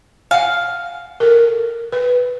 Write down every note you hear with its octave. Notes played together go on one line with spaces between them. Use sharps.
F5 F#5 G#5
A4 A#4
B4